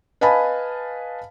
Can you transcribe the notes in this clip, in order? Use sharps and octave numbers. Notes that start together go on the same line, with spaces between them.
B4 D#5 F5 G#5 A5 B5